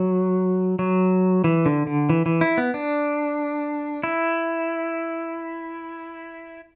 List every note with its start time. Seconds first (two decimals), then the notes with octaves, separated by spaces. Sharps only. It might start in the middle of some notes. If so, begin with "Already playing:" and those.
Already playing: F#3
0.79 F#3
1.44 E3
1.66 D3
1.87 D3
2.10 E3
2.26 E3
2.41 E4
2.58 B3
2.74 D4
4.03 E4